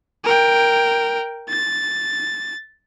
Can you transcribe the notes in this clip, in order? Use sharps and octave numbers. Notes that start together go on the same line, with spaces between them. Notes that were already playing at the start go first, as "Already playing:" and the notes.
A#4 G5
A6